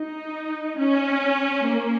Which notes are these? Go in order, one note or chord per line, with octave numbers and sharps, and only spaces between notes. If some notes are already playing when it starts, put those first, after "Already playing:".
Already playing: D#4
C#4
A#3